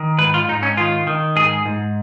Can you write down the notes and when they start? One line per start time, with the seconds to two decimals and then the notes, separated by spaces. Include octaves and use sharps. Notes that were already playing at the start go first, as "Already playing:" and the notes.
Already playing: D#3
0.18 G#2 B4
0.34 F4
0.48 G#2 D#4
0.63 C#4
0.77 D#3 F4
1.07 D#3
1.36 G#2 G#4
1.66 G#2